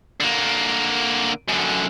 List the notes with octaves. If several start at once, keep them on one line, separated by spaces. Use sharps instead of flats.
D3 A#3
F#2 D3